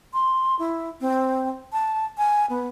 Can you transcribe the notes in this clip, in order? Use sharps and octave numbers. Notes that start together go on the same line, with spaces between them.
C6
E4
C4
A5
G#5
B3